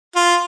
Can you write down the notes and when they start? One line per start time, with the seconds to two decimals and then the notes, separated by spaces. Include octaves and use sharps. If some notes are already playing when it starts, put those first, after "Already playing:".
0.16 F4